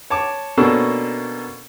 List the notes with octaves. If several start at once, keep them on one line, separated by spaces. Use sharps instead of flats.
C#5 A5 D6
B2 A#3 C#4 D4 A4